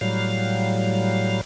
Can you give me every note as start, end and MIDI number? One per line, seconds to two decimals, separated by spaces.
0.01 1.41 45
0.01 1.41 54
0.01 1.41 55
0.01 1.41 77